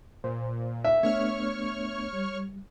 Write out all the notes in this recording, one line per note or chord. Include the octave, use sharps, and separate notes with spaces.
A#2 C5
E5
A3 B3 D4 C#5 C#6 F6
G3